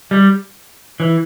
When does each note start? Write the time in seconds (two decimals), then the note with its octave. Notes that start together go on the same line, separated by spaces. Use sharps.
0.11 G3
1.00 E3